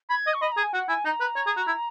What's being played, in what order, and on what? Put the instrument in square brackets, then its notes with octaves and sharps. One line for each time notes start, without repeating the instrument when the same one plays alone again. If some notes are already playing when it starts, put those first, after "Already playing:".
[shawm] B5 [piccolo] G#6
[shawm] D#5
[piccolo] C#6
[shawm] D#5 [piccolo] B5
[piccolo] A#5
[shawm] G#4
[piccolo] G#5
[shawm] F#4 [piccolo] F#5
[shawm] E4 [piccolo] G#5
[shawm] D#4 [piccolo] A#5
[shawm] B4
C#5
G#4
F#4
E4